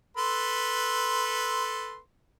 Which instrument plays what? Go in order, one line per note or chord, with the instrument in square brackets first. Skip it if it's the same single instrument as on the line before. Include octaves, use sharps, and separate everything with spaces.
[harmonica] A4 B4 C6